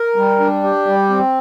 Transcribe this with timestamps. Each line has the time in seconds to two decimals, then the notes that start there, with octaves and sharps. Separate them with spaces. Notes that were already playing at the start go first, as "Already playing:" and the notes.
Already playing: A#4
0.16 G3
0.40 D4
0.64 G4
0.87 G3
1.10 C4